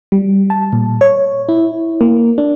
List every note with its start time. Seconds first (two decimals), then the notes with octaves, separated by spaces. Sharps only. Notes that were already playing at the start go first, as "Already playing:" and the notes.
0.12 G3
0.50 A5
0.73 A#2
1.01 C#5
1.49 E4
2.01 A#3
2.38 D4